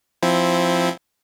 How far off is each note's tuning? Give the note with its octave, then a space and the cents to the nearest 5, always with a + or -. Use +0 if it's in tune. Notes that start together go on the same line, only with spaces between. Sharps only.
F3 +0 C4 +0 E4 +0